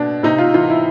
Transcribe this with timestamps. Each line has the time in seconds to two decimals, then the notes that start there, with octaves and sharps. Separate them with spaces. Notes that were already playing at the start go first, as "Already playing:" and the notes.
Already playing: B2 D4
0.23 C3 D#4
0.38 F4
0.54 E3 F4
0.70 E4